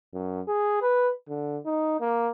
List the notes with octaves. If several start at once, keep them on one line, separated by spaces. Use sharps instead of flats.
F#2
G#4
B4
D3
D#4
A#3